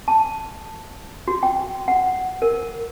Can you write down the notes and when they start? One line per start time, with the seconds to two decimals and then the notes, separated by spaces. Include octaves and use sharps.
0.08 A5
1.28 F#4
1.43 G5
1.88 F#5
2.42 A#4